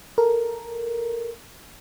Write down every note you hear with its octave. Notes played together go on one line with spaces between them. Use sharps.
A4 A#4